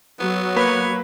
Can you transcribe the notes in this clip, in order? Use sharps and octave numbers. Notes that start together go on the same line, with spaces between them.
F#3 B3
A#3 B4 C#5 B5